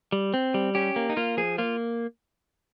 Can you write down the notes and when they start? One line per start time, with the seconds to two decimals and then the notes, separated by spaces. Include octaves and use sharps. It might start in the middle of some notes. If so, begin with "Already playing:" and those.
0.12 G3
0.34 C4
0.54 G3
0.75 C#4 G4
0.96 A#3
1.09 D#4
1.17 A#3 F4
1.37 F3 G#4
1.58 A#3 F4